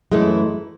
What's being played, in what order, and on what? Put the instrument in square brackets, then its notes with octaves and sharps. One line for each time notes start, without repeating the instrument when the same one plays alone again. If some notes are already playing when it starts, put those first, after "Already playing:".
[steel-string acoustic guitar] F#2 E3 A3 E4 [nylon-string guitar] G#3